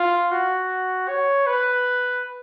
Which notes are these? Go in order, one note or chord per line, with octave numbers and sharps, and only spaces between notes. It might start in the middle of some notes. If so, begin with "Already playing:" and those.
Already playing: F4
F#4
C#5
B4